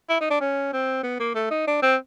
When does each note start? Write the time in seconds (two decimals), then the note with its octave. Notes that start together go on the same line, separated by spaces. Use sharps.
0.09 E4
0.20 D#4
0.30 D4
0.41 C#4
0.73 C4
1.03 B3
1.19 A#3
1.35 A3
1.50 D#4
1.67 D4
1.82 C4